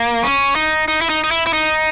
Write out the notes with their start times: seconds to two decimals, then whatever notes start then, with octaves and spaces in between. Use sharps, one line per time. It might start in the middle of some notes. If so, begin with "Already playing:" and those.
Already playing: A#3
0.23 C#4
0.55 D#4
0.88 D#4
1.01 E4
1.09 D#4
1.24 D#4
1.31 E4
1.46 E4
1.53 D#4